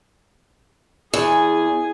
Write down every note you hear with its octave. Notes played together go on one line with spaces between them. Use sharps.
E2 G#4 G#5